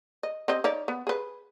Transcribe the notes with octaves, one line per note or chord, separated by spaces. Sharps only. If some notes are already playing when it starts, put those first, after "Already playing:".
D#5
C4 G4 D#5
D#4 C#5 D5
B3
G#4 B4